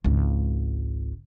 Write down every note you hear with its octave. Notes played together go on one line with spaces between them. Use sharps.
G#1 C#2